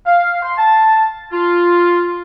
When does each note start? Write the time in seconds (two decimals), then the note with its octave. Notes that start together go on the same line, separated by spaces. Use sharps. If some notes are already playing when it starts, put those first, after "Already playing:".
0.07 F5
0.42 C6
0.58 A5
1.33 F4